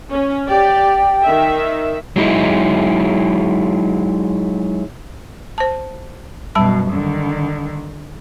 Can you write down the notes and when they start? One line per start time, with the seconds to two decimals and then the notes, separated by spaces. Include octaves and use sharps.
0.11 C#4
0.49 G4 D5 G5
1.25 D#3 E5
2.16 F#3 G#3 D#4 E4
5.58 C5 A5
6.55 F#2 B2 G3 A5 B5
6.91 D3 D#3